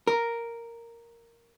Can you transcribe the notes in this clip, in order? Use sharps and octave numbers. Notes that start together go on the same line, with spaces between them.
A#4